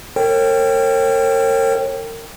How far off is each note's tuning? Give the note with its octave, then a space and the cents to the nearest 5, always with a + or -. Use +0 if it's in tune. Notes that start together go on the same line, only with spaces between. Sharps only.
A#4 -35 C#5 -40 G5 +0